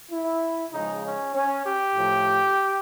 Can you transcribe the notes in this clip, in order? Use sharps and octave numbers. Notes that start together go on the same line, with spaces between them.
E4
C#3 F3 G#3 D#4
C#4
C#4
G4
A2 F3 A3